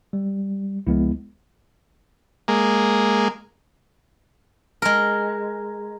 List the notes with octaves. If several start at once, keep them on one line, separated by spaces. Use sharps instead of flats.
G3
C#2 F3 G#3 B3 E4
G#3 A#3
G#3 A#4